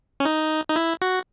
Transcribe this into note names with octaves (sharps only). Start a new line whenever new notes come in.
C#4
D#4
D#4
E4
F#4